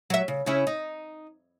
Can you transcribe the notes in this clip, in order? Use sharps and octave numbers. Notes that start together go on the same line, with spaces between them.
F#3 E5
C#3
C#3 C#4 E4
D#4